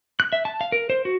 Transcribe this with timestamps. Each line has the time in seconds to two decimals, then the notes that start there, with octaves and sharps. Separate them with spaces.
0.20 F#6
0.33 E5
0.45 A5
0.61 F5
0.72 A#4
0.90 C5
1.05 F#4